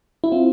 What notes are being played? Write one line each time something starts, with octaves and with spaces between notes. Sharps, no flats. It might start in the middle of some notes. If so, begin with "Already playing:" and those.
E4
C4 F4